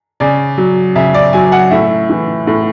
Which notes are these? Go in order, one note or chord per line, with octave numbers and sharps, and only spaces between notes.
C#3 D5
F#3
C#3 E5
D5
F#3 G#5
F#5
A2 E5
E3
A2